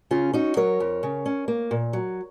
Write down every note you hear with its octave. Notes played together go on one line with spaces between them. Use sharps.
C#3 C#4 F4
C#4 D#4 F#4
F#3 A#4 C#5
F2
C#3
C#4
A#3
A#2
F#3